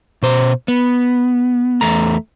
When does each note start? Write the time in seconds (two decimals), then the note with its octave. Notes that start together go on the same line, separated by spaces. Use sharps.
0.22 B2 C5
0.68 B3
1.81 E2 A3 A#5